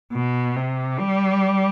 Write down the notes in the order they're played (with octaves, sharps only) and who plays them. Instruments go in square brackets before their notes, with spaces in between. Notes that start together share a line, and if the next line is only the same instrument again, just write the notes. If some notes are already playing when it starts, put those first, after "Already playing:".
[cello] B2
C3
G3